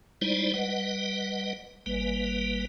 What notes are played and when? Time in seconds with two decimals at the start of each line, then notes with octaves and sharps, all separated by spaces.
0.21 G3 G#3 D#4 E4 C5 D5
0.54 G3 B4 D#5 F#5
1.86 G#1 G3 A#3 B4